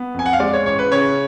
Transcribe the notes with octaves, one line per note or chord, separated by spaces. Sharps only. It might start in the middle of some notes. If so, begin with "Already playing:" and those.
Already playing: B3
F2 G#5
F#5
F5
G#3 D5
C#5
A1 C#5
B4
C#3 C#5